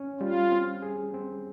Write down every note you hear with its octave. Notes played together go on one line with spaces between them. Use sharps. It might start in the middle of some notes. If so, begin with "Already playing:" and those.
Already playing: C#4
G3 F4
C4
G#4
C4